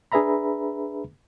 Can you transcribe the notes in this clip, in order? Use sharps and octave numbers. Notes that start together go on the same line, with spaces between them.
D4 G#4 B4 E5 A#5 B5